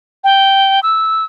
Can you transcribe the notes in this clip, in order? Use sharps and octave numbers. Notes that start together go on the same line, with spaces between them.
G5
E6